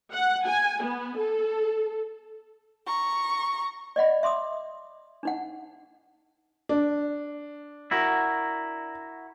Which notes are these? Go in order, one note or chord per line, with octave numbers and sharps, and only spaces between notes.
F#5
G#5
B3
A4
A#5 C#6
D5 D#5 F#5 B5
E5 C6 D6 D#6
D4 D#4 F#5
D4
E4 F#4 A#4